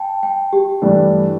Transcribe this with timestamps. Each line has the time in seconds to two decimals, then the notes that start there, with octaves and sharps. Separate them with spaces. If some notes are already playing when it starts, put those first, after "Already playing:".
Already playing: G5 A5
0.23 G5
0.53 G4
0.82 G2 E3 A3 D4